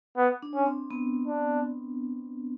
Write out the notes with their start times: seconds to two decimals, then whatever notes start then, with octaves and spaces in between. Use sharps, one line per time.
0.17 B3
0.42 D4
0.55 C#4
0.66 C4
0.91 B3
1.28 D4